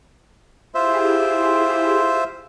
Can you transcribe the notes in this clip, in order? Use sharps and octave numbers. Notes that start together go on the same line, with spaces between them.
E4 F4 G4 G#4 C5 E5